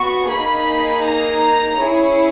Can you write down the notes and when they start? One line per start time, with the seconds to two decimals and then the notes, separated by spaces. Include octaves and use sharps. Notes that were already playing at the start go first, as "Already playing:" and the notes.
Already playing: B3 F#4 C#6
0.29 A#3 D#4 G#4 B5
1.04 A#5
1.78 C#4 E4 G#4 C#5